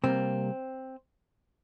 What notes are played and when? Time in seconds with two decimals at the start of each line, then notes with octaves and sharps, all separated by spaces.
0.04 C3 G3 A#3 C4